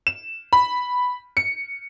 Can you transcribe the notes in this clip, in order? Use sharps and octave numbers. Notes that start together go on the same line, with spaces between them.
E7
B5
C#7